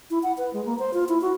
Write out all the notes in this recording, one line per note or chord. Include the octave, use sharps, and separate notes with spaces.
E4
F#5
B4
G#3
A#3
C5
F4
E4
F#4